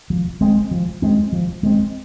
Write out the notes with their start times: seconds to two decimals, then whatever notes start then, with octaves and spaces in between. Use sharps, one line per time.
0.10 F3
0.41 G#3 C4
0.71 F3
1.02 G#3 C4
1.33 F3
1.63 G#3 C4